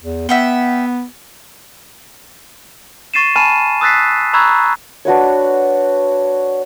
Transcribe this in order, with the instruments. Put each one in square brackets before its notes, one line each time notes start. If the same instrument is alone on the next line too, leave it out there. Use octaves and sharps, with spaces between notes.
[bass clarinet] E2
[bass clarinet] B3 [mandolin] E5 F#5 G5
[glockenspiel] C#6 A6 C7 D#7 E7
G#5 A5 B5 F6 D#7 E7
D#6 E6 F#6 A6 B6 C7
A#5 B5 C#6 E6 F#6 G#6
[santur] D4 F#4 B4 C#5